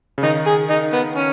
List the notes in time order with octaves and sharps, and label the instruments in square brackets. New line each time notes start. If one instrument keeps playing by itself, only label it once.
[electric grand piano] C#3
[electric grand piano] D#3 [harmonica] D#4
[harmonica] G#4
D#4
B3
C#4